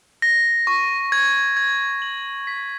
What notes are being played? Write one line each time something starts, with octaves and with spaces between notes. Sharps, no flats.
A#6
C#6
G#6
G#6
F#7
B6